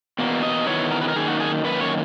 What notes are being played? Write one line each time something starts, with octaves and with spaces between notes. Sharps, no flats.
E2 B2 A#3
D#5
E2 D#3 F#3 B3 E4 C#5
A#4
B4
A#4
F#2 D#3 A#3 D#4 G#4
F#4
G#4
F#2 D#3 A#3 B4
C#5